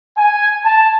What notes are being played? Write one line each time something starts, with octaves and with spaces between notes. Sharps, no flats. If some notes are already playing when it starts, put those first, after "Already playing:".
G#5
A5